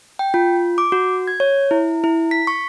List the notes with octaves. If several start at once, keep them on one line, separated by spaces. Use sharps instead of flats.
G5
F4
D6
F#4
G#6
C#5
E4
E4
B6
C#6